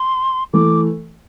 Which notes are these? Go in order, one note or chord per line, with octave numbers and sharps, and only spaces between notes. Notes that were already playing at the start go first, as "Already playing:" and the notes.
Already playing: C6
E3 A3 D6